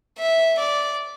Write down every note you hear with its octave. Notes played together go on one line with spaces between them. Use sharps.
E5
D5